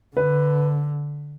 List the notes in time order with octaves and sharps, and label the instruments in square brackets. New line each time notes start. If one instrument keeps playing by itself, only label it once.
[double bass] D3 [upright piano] B4